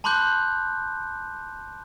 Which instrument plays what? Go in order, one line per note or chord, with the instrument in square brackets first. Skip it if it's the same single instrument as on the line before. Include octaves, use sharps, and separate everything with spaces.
[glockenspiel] A5 B5 C6 D6 F#6 G6